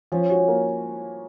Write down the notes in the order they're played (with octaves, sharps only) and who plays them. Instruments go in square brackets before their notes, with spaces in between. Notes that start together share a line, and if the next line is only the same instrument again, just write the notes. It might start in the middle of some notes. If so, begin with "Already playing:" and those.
[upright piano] F3 [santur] C#4
[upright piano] F#4
A#3